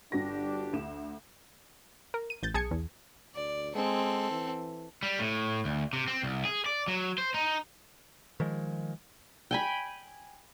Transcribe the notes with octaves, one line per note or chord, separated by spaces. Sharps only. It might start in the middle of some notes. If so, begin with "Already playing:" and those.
G1 G2 D4 F#4 G4 A#6
D2 E7
A#4
D#7
A1 G6 A6
B1 G#4 A5 D#6 G#6 C#7
E2
D2 D5
G#3 C4 A4
E3
G3
A2
D2
C3
C4
C2
G#4
D5
F#3
C5
D#4
D#3 F3 G#3
G5 G#5 B5